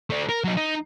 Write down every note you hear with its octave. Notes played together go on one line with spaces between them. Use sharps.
A3 D4
A#4
F#3 D#4
D#4